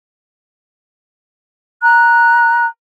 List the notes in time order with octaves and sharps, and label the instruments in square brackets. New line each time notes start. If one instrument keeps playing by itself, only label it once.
[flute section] A#5 F#6